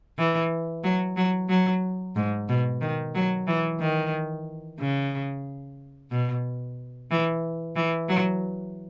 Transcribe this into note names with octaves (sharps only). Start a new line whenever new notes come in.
E3
F#3
F#3
F#3
G#2
B2
D#3
F#3
E3
D#3
C#3
B2
E3
E3
F#3